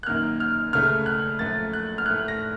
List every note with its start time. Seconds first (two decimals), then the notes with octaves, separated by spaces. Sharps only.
0.03 F#6
0.06 F#2 D#3 A#3 F6
0.40 F6
0.73 C#2 C#3 A3 F6
1.06 F#6
1.39 F#2 F3 A3 A6
1.73 F#6
1.98 F6
2.06 A2 A3 F#6
2.28 A#6